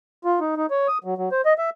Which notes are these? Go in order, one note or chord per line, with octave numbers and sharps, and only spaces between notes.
F4
D#4
D#4
C#5
D#6
F#3
F#3
C5
D#5
E5